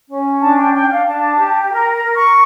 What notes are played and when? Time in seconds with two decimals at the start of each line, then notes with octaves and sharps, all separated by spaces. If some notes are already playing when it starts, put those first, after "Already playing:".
0.09 C#4
0.41 D4 A5
0.58 G5
0.73 D4 G5
0.90 F5
1.06 D4 A5
1.38 G4
1.71 A#4 A#5
1.93 A#5
2.03 A#4
2.15 C#6